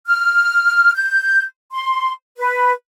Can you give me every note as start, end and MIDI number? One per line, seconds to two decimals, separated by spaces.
0.07 0.92 89
0.95 1.43 91
1.72 2.11 84
2.37 2.72 71